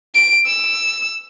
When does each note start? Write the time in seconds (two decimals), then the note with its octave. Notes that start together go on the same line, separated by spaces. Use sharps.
0.15 D7
0.46 E6